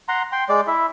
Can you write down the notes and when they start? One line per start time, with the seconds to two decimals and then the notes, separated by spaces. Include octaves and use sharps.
0.09 F#5 A#5 C6
0.32 G5 C6
0.49 G#3 D5
0.67 E4 E5